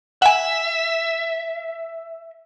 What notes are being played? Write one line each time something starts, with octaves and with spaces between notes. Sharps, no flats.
E5 F#5 G#5